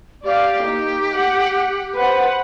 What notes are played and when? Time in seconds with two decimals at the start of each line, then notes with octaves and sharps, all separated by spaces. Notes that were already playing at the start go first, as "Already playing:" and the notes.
0.24 G4 D5 F5
0.63 A#3 D#4
1.14 F#5
1.94 B4 C5 F#5